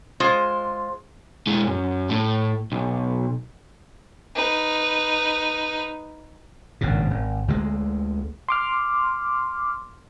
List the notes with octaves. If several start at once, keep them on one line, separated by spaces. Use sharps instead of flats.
G#3 F4 C5
G#3 E4
F#2
A2
B1
D#4 B4
G#1 G2 A#2 C#3
G#1
D2 D3 D#3 G#3
C6 D6 F6